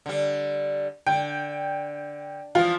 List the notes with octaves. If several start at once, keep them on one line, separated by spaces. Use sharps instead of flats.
D3 G3
D3 G5
E3 F3 F4